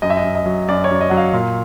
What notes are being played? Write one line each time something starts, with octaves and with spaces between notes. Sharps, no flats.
F#2 D#5
E5
D#5
F#2
D#5
F#3
F#2 D5
C#5
F#2 D5
D#5
F#3 F#5
F5
A#2